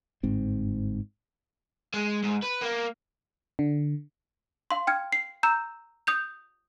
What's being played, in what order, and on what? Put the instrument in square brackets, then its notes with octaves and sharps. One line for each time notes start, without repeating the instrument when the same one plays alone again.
[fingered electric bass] G1 G#2 C4
[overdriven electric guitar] G#3
G#2
B4
A#3
[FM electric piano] D3
[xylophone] F5 C6
G5 F6 G#6
C7
A#5 E6 G6 E7
D#6 G6 F7